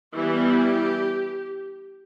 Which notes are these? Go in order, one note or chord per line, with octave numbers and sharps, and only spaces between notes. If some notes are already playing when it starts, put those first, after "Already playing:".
E3 G3 B3 E4 G4